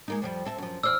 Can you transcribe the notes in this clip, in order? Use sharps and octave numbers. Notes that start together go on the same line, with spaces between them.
G#3 A#3 D#4
F2 F3 G3
C4 A4 E5
F#2 F3
E2 C5 D5 E6 F6